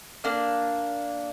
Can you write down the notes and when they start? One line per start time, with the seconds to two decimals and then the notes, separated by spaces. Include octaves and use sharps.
0.24 A#3 D4 F5